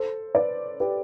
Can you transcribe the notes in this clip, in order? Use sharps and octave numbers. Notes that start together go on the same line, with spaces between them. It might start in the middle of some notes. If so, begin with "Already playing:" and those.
Already playing: A4 C5
B4 D5
G4 B4